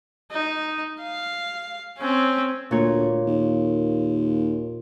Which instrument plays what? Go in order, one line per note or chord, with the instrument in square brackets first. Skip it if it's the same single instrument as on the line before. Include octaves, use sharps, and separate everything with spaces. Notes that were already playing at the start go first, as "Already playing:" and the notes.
[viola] D#4
F5
C4 C#4
[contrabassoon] D2 [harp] A#2 C#5
[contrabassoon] D#2